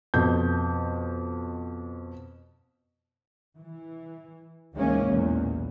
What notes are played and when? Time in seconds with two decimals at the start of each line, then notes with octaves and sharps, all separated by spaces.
0.14 F2 B2 G6
3.56 E3
4.75 D2 D#3 E3 G#3 A#3 C#4
5.06 B1 E2 A#2